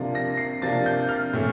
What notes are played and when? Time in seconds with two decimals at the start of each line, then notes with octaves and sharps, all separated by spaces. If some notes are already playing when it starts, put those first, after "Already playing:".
Already playing: C3 F3 A#3 D4
0.15 A#6
0.38 C7
0.62 C3 F3 A#3 D4 A6
0.86 G6
1.09 F6
1.33 A2 E3